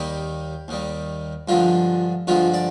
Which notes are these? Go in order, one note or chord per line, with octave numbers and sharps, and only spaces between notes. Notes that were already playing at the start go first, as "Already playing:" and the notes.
Already playing: D#2 D#3 G3 G4
D#2 D#3 G3
G2 D3 F3 G#3 F4
G2 D3 F3 G#3 F4
D5